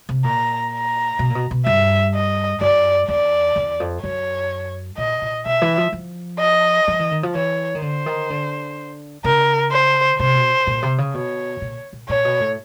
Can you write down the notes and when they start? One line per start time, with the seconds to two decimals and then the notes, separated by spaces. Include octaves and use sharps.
0.09 C3
0.24 A#2 A#5
0.72 A#5
1.19 B2
1.30 A#2
1.35 B2
1.51 B2
1.66 G2 E5
2.14 D#5
2.61 F#2 D5
3.08 E2 D5
3.56 E2
3.80 F2
4.03 F#2 C#5
4.98 A#2 D#5
5.22 A#2
5.46 B2 E5
5.62 E3
5.77 F3
5.92 F3
6.40 D#5
6.88 F3
6.99 E3
7.12 D#3
7.23 F3
7.35 E3 C#5
7.75 D#3
7.82 D3 C5
8.06 D#3
8.30 D3
9.24 C#3 A#4
9.72 C5
10.19 C3 C5
10.35 B2
10.67 A#2
10.82 C3
10.98 C#3
11.14 B2 C#5
11.61 A#2
11.93 A#2
12.08 A#2 C#5
12.25 B2
12.40 A2